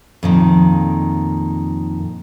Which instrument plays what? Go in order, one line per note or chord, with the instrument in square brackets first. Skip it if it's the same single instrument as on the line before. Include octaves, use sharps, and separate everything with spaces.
[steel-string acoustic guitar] F2 A#2 D#3